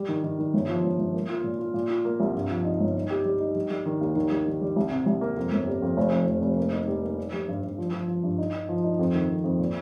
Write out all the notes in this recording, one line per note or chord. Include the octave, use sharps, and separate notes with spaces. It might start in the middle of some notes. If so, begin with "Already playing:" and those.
Already playing: G3
D#3
D#3
D#3
G1
F3
G1
G1
A#3
F4
A#2
F4
A#2
F4
A#3
C2
G2
F3
D#4
G1
D#4
G4
G3
D#4
G3
G3
D#3
D#2
D#3
G3
D#3
G3
C2
C3
C2
A#3
F2
G1
G3
F2
F1
F2
F1
F1
A#3
D#4
G3
A#3
D#4
G3
G2
G2
F3
F3
F3
G2
D#4
D#4
F3
D#4
F2
D#3
F2
F2
A#2